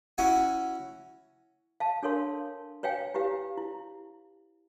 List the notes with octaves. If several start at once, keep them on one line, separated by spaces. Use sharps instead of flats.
C#4 E4 F#4 F#5 G#5
F5 A5
D4 A4 A#4 C#5 F5 C6
B4 C#5 F5 G5 G#5
E4 G4 B4 F5
E4